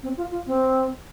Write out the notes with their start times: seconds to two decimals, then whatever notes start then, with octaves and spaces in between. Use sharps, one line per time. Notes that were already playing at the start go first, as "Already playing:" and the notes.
0.03 C4
0.17 F4
0.31 F4
0.47 C4